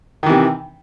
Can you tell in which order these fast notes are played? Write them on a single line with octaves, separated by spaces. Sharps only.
D#3 E3 C3